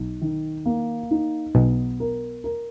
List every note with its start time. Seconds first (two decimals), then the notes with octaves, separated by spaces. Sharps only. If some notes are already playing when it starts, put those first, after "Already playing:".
Already playing: B1 D#4
0.22 D#3
0.66 A#3
1.11 D#4
1.55 B1 B2 B3
2.00 A#4
2.44 A#4